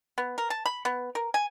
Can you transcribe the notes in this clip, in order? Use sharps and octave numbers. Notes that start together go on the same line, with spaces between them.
B3
A#4
A5
B5
B3
A#4
G#5